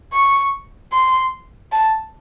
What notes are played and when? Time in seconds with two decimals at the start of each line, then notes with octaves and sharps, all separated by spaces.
0.13 C#6
0.92 C6
1.72 A5